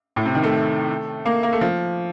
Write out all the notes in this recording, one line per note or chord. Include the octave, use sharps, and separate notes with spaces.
A2
C3
D#3
A3
A#3
A#3
A3
F3